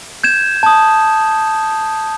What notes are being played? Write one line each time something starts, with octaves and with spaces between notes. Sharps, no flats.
G6 G#6 E7
A5 D#6